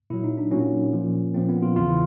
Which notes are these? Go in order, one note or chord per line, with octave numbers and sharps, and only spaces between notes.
A#2 F#3 E4
D#4
D4
A#2 F#3 C#4
A#2 F3
A#2 F3 C4
B3
F4
E2 C#3 E3 F4
E4